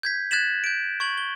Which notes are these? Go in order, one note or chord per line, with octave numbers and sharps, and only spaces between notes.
G6 G#6 B6
F#6 G#6 A6 B6 E7 F#7
G6 D7
C#6 G#6 F#7
G7